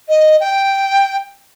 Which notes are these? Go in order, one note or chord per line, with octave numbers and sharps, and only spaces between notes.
D#5
G5